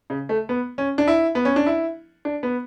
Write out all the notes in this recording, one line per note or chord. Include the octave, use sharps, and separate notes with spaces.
C#3
A3
B3
C#4
D4
E4
B3
C#4
D4
E4
D4
B3